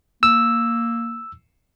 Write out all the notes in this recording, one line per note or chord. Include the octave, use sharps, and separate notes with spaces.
A#3 E6